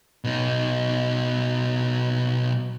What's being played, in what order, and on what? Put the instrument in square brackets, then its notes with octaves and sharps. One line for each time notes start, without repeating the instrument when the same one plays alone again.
[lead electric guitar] B2 D#4